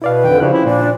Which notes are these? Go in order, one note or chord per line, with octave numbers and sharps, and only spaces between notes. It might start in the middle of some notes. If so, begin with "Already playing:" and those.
B2 E4 B4 D5 F5
F2 D3 D#3 G5
C#3 F3 D4 E4 G4 F#6
C#4 E4
A#2 A#3 D4